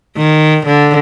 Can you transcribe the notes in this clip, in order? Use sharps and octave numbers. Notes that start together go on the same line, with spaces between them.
D#3
D3